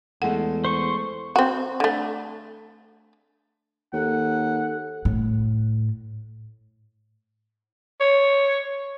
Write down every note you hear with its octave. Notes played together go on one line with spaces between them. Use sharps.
E2 G#3 A3 A4 F#5
C5 C#6
C4 F#4
D3 A3
D#2 A4 F#5
A2
C#5